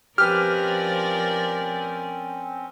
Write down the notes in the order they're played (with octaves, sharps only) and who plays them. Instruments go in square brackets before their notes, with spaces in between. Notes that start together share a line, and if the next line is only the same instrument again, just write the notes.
[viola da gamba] F3 A#4 D5 [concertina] C4 C#4 [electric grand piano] G4 B4 [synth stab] F6